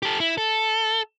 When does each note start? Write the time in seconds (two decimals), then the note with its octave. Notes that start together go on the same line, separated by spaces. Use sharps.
0.03 G4 A4
0.20 E4
0.38 A4